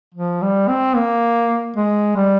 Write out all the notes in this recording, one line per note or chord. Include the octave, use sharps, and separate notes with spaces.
F3
G3
C4
A#3
G#3
G3